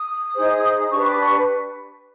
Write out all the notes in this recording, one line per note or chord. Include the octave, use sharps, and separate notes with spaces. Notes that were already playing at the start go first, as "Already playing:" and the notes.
Already playing: D#6
D#4 G#4 C5
D#6
D4 G4 B4 C#6
D6
C#6